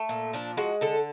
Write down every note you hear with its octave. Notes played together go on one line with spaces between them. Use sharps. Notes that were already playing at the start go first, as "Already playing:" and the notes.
Already playing: A3
A#2
F3 D4
G#3 F#4
D3 A4